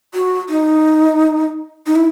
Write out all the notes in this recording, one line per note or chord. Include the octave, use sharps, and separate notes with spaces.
F#4
D#4
D#4
E4